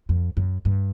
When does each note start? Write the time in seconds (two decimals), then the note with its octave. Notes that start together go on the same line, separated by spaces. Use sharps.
0.09 F2
0.37 F#2
0.65 G2